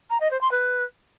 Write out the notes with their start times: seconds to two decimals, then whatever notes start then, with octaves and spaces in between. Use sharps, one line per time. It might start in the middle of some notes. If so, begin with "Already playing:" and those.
0.10 A#5
0.20 D#5
0.31 C5
0.41 C6
0.51 B4